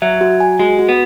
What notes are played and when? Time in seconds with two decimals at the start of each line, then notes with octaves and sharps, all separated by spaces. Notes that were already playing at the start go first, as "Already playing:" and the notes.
0.02 F#3 E5
0.21 F#4
0.40 G#5
0.59 G#3 F#4
0.79 F#4
0.89 B3